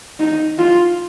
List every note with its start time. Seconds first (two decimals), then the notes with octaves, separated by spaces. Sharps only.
0.20 D#4
0.58 F4